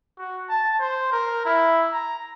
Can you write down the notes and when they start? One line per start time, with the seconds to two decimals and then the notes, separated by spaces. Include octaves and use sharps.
0.18 F#4
0.49 A5
0.80 C5
1.12 A#4
1.45 E4
1.93 A#5